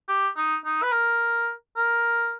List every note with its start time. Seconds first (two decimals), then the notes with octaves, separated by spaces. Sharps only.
0.08 G4
0.36 D#4
0.65 D#4
0.83 B4
0.92 A#4
1.76 A#4